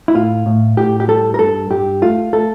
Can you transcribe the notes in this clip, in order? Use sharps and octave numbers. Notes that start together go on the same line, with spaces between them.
E4
A2 F4
A2
A2 G4
G4
G3 A4
A#4
G2 A4
G2 G4
A3 F4
A3 A4